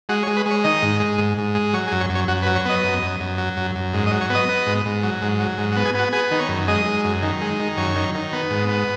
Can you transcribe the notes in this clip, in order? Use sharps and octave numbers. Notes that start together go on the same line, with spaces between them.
G#3 F#4
C#5
G#3
B4
G#3 C#5
D#3 D#5
G#2
G#3
G#2
G#2
G#3
F#3 C#5
G#4
F#2
C#5
F#2
C#5
F#2 F#4
B4
F#3
C#5
B3 D#5
F#2
F#2
F#2
F#3
F#2
F#2
G#2
D#5
F#3
C#5
B3 D#5
B3
G#2
G#2
F#3
G#2
F#3
G#2
F#4
B3
G#4
B3 F#4
B3 G#4
D#3
C#5
F#2
G#3 D#5
G#3
F#2
D#3
G#3
D#3
F#2 C#5
D#3
D#3
B3
G#2
B3